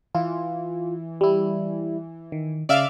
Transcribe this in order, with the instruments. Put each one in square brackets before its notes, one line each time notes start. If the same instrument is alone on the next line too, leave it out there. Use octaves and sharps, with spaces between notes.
[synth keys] E3 [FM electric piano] F4
[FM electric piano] G3 E4
D#3
[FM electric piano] C#3 [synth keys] D5 E5 F5